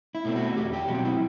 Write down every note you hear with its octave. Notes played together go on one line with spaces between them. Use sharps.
E4
B2 A3 C4
F#4
E2 G4
G4
B2 F#3 C4 F#4
E4